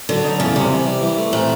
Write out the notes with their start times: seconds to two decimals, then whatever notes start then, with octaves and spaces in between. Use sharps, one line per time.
0.09 D3 F#3
0.25 D#4
0.40 E2 C#3
0.55 C3 G3
0.71 C3
0.86 G3
1.01 E3
1.18 A3
1.33 A#2 C4